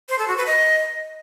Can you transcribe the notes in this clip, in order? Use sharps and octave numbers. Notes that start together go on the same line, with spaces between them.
C5
A4
F#4
B4
D#5